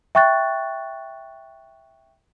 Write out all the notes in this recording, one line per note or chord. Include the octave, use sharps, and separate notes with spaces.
E5 G5 C#6 F#6 A6